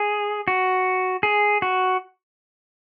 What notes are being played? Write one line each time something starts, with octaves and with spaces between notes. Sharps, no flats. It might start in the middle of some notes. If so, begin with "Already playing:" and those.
Already playing: G#4
F#4
G#4
F#4